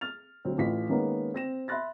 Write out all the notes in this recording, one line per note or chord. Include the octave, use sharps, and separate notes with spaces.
F6 A6 F7
D2 F#3 C4
A1 A3 F4 B6
D#3 G#3 A#3 B3 C#4
C4 A#6 E7
E5 B5 C6 F#6 A6 A#6